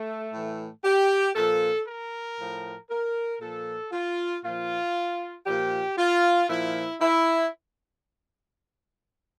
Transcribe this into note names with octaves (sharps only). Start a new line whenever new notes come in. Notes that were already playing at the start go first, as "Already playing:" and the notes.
Already playing: A3
A2 E3
G4
A#2 F3 A4
A#4
A2 F3
A#4
A#2 F3 A4
F4
A#2 F3 F4
A#2 F3 G4
F4
A#2 F3 E4
E4